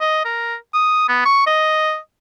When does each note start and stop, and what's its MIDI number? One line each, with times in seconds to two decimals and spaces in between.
0.01 0.23 75
0.25 0.55 70
0.74 1.08 87
1.09 1.23 59
1.26 1.42 85
1.47 1.97 75